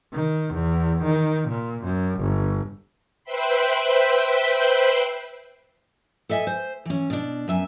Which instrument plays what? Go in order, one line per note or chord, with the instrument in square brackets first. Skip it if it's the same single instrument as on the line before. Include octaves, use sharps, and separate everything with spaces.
[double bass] D#3
E2
D#3
A#2
F#2
G1
[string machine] B4 C5 E5 G5 B5 C6
[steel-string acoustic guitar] A4 D#5 E5 G5 G#5
C5
E3 C#4
B2 D4
F#2 E5 G#5